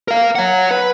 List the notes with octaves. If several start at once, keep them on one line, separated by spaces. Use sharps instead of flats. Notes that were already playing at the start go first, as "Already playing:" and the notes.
A#4 F5
C#5 F#5
B4